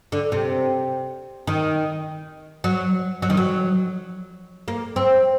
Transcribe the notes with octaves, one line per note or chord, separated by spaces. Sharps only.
D3
C3
D#3
F#3
F#3
D#3
F#3
A#3
C4